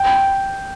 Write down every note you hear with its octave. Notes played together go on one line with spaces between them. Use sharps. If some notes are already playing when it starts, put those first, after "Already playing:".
Already playing: G5